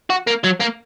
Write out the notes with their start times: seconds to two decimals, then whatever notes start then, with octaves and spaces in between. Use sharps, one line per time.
0.10 F#4
0.27 A#3
0.44 F#3
0.61 A#3